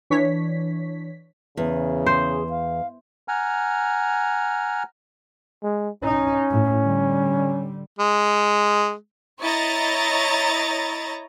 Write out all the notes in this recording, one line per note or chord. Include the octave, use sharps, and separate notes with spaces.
E3 D4 C#5 B6
E2 C#3
G#4 C5
F5
F#5 G#5 A#5 F6
G#3
C#4 D#4
A2
D3 G3
G#3
E4 C#5 D#5 A#5 A6